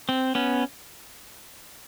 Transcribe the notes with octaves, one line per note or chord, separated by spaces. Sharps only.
C4
B3 C#4